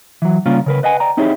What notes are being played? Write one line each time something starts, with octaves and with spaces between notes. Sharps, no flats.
E3 F#3
C#3 G3 A#3 C#4 F4
C#3 A#4 B4
B4 D#5 F#5 G#5
D5 G5 A#5
C4 D#4 E4 G4 G#4 C#5